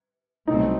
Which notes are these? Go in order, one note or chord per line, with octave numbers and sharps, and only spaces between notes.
C2 B2 F#3 A3 C4 D#4